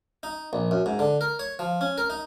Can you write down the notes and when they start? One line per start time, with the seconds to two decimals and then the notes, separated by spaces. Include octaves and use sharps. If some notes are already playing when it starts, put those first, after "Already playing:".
0.23 D#4
0.53 A#1
0.71 F#2
0.86 G#2
0.99 D3
1.21 A#4
1.39 C#5
1.59 F3
1.81 C#4
1.98 A#4
2.10 D#4